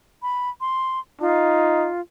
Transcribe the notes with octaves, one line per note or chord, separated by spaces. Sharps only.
B5
C6
D#4 F4